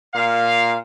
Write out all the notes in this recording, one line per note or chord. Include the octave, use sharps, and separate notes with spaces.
A#2 F5